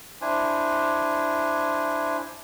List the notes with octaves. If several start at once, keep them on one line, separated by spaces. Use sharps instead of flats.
D4 E4 C5 G#5